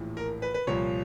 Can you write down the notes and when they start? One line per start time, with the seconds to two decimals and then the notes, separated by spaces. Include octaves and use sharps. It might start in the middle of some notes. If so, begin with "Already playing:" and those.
Already playing: A#1 A2 E3
0.17 A#4
0.42 B4
0.54 B4
0.67 C2 A#2 F3 C#5